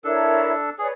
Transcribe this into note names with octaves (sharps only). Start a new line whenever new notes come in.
D4 E4 A4 A#4 C#5
G#4 B4 C#5 D5